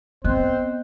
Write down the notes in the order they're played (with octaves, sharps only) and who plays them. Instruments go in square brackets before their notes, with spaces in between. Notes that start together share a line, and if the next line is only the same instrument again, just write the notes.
[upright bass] B3 [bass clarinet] C4 [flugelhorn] C5 [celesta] D#5 F#6